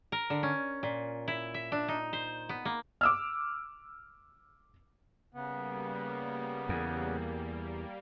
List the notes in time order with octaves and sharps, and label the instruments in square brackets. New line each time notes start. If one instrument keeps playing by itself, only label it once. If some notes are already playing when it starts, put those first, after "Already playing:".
[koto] A#4
D3
C#4
A#2
E4
E5
D4
D#4
C5
B3
A#3
[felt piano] D6 E6 F6
[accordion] C#3 B3 [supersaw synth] G3 A#3
[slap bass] E2